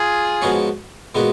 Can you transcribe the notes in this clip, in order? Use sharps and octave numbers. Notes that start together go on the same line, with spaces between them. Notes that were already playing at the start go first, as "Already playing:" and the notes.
Already playing: F4 G#4
G#2 F3 B3 F#4 C#5
A#2 G#3 B3 F#4